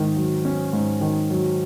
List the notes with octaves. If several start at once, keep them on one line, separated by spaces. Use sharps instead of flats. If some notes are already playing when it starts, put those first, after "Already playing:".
Already playing: G#2 D#3
F#3
C#4
G#2
D#3
F#3